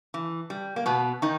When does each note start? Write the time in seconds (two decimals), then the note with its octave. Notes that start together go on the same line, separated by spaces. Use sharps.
0.14 E3
0.50 G3
0.76 A#3
0.86 B2 B3
1.22 D#3 D#4